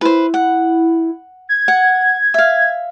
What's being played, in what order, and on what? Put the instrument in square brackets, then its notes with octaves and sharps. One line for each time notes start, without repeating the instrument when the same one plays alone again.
[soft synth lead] E4 [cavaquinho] B4 C5
[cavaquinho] F#5
[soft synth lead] G#6
[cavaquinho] F#5
E5 F5